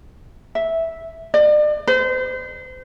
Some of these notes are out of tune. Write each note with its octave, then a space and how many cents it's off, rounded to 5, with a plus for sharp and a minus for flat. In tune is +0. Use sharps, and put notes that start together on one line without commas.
E5 -5
D5 +40
C5 -35